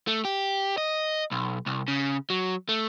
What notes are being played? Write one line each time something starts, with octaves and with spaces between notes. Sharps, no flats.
A3
G4
D#5
B1
C2
C#3
F#3
A3